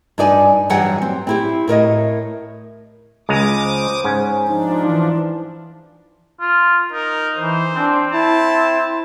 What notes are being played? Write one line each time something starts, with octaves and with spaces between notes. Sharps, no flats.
G2 D4 D#4 D5 G#5
G2 E3 F#3 G3 F#5 G5
C4
C4 E4 G4
A2 A#4 C#5 D#5
C#2 G#3 A#5 D6 D#6
C5
G#2 C#4
F3 D4 D#4
E3
F4
D#4 A#4
E3 C5
C4 D4
E4 A5